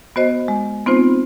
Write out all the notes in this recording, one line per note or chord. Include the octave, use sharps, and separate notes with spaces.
B3 F#4 C5 D#5
G#3
B3 C4 D#4 F4 C5